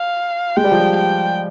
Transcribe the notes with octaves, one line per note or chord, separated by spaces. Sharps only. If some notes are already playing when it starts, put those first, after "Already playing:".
Already playing: F5
G#3 G5
G3
F3
G3
G5